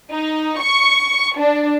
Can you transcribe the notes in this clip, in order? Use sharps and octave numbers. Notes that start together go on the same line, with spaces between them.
D#4
C#6
D4